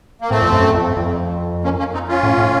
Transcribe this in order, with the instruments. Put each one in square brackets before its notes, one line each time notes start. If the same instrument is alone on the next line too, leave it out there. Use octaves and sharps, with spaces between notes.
[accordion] A#3
[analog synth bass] A2 [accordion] A3 C4
[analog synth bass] F2
F#2
F2
F2
[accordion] A#3 C#4
A#3 C#4
C4 D#4
C#4 F4
[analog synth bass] A2
A2